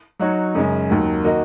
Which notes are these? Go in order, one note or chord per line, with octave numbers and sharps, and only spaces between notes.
F#3 D#4 F#4 C#5
F#2 C#3 G#3 C#4
D#2 D#3 F#3
D#3 A#3 F#4 D#5